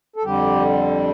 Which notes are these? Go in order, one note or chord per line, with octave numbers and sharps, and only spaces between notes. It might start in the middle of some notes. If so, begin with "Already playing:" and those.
A4
F2 D3 G3 G4